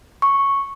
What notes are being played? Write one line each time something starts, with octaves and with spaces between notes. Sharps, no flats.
C#6